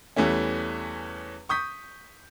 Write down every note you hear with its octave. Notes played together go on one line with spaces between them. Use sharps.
E2 E3 G3 A3 C#4
C#6 D#6 G6 B6